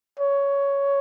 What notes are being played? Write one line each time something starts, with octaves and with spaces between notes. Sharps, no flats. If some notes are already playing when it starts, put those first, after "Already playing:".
C#5